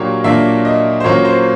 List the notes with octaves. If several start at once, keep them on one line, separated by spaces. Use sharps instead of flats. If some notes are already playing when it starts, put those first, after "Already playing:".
Already playing: A#2 F#3 A#3 D4 G4 C#5
A#2 F#3 A#3 D4 E5
D#5
C5
A#2 F#3 A#3 C#4 C#5
C5